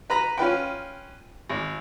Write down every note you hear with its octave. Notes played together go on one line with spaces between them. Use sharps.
B4 A#5 B5
C#4 F4 B4 G5
G#1